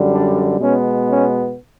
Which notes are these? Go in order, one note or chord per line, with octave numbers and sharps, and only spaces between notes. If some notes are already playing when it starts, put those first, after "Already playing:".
Already playing: F#2 D3 G3
D4
B2 G#3 B3 C#4
C#4